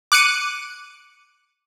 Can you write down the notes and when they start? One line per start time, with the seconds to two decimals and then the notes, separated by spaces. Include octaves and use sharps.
0.12 D6 F#6 C#7 D#7